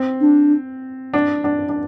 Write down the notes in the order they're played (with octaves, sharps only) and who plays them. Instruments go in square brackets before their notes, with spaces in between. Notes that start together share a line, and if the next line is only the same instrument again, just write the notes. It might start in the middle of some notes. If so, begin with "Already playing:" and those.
Already playing: [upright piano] C4
[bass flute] D4
[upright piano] D4
D4
D4